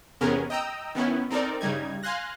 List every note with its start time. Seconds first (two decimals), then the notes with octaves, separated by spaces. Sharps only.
0.21 E2 C3 B3 C#4 G#4 A#4
0.50 D#5 G5 A#5 D#6 E6
0.95 D#3 B3 C#4 E4
1.31 C4 D#4 A4 A#4 D5
1.61 G2 C#3 G3 D#4 G#6
2.03 F5 G#5 C6 F#6 A#6